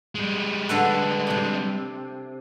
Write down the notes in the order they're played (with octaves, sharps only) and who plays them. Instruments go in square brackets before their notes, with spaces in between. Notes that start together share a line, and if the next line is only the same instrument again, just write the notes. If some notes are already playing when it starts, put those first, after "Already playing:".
[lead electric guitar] G3 G#3
[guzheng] D3 A4 B4
C3 D4